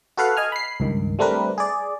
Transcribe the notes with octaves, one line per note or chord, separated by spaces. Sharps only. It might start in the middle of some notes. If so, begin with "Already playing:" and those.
F#4 A4 B4 F5 F#5
D#5 G#5 F6
B5 C7
C#2 G2 D#3
G3 A3 C4 D4 A#4 B4
G#4 D5